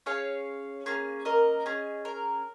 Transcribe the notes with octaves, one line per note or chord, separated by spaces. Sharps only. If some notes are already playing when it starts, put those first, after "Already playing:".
C#4 G#4 C#5 F5
A#3 C#4 G#4
A#4 D#5
C#4 G#4
A#4